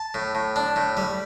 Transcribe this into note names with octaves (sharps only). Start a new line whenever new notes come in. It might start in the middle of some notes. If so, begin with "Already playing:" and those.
Already playing: A5
A2
A2
D4
A2
G3